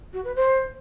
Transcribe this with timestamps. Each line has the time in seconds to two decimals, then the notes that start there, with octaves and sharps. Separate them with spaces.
0.13 F#4
0.25 B4
0.36 C5